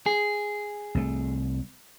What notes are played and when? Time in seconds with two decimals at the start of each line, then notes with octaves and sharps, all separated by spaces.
0.06 G#4
0.95 C2 A3